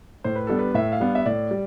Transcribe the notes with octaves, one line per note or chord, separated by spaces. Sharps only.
A2 C5
B4
G3 B3 D4 A4
B4
A2 E5
F5
G3 B3 D4
E5
A2 D5
G3